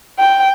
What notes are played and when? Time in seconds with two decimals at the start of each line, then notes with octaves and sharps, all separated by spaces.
0.19 G5